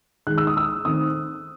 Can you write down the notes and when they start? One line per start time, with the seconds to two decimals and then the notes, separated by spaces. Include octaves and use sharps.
0.27 D#3 G#3 D#4 F#6
0.38 E6
0.47 D#6
0.57 E6
0.85 D#3 A3 C4 D#4 D#6